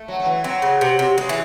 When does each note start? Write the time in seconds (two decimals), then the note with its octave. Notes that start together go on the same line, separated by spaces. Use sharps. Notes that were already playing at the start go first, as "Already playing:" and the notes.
Already playing: A3
0.08 F#3
0.20 F#3
0.26 E3
0.44 F#3 C4
0.62 C#3
0.81 C3
0.99 C3
1.17 C#3 G#3
1.29 E3